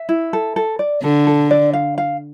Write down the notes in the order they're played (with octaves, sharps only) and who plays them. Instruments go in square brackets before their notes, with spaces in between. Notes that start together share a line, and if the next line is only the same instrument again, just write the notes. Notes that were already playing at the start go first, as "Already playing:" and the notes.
Already playing: [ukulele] E5
E4
A4
A4
D5
[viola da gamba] D3 [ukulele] A4
[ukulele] A4
D5
F5
F5